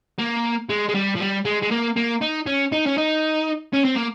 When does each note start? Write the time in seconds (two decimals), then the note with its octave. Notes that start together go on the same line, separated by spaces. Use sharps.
0.18 A#3
0.69 G#3
0.89 G#3
0.95 G3
1.16 F3
1.20 G3
1.45 G#3
1.62 G#3
1.71 A#3
1.96 A#3
2.21 D#4
2.46 C#4
2.72 D#4
2.86 C#4
2.98 D#4
3.73 C#4
3.84 C4
3.96 A#3